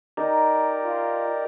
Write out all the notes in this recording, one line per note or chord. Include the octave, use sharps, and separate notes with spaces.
D#4 G4 A#4 D5
F4